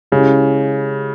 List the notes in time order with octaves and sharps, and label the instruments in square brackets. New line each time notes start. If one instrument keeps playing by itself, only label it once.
[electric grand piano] C#3 [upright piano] G#3 C#4 E4 G4